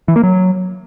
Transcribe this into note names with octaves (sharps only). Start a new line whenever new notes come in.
E3
A#3
F#3